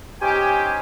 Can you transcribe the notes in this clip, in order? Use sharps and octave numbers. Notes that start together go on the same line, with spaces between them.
C#4 D#4 G4 C5 G5 G#5